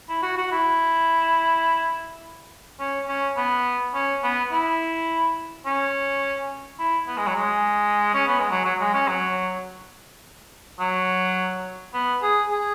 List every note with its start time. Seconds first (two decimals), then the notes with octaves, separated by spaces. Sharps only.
0.09 E4
0.23 F#4
0.38 F#4
0.51 E4
2.79 C#4
3.08 C#4
3.37 B3
3.94 C#4
4.23 B3
4.51 E4
5.66 C#4
6.79 E4
7.08 B3
7.17 G#3
7.27 F#3
7.36 G#3
8.14 C#4
8.27 B3
8.39 G#3
8.51 F#3
8.65 F#3
8.80 G#3
8.94 C#4
9.07 F#3
10.79 F#3
11.94 B3
12.22 G#4
12.51 G#4